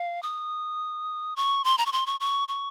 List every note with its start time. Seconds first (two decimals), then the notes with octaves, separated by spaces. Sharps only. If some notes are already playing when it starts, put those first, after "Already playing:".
Already playing: F5
0.23 D#6
1.36 C#6
1.64 C6
1.78 A#5
1.86 C#6
1.92 C6
2.06 C#6
2.20 C#6
2.48 C#6